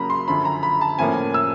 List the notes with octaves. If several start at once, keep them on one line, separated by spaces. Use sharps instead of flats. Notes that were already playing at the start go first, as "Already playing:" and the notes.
Already playing: C#3 F#3 A#3 C#4 A#5 B5
C6
F#2 D3 F3 B5
A#5
B5
A5
A2 F3 A#3 C#4 G#5
E6